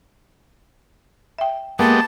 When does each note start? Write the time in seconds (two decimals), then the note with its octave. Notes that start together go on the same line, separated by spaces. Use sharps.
1.38 E5 G5
1.79 G#3 A#3 B3 G4 A5